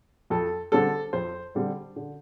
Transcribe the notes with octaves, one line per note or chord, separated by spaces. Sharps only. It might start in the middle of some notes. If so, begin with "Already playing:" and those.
F2 A4
D3 G3 C4 A4
F2 C5
D3 G3 C4
D3